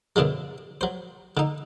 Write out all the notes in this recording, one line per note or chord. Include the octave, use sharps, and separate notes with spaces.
F#2 B2 D3 F#3 G#3
F#3 C5
D3 D#4